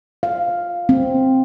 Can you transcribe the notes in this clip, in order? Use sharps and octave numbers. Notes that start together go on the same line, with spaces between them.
F5
C4